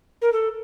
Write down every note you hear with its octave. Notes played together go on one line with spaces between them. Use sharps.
A#4
A4